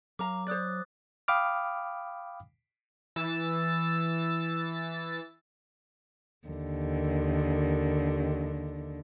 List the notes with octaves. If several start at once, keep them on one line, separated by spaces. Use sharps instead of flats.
F#3 A#4 F5 A#5 D6
C5 D5 D#6 F#6 A6
F5 G5 B5 D6 D#6 F6
E3 E6 A6
D#2 D3